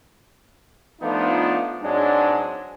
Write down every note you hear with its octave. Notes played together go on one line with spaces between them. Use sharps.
F3 A3 B3 D4 D#4 F4
G#2 F#3 G#3 C4 D4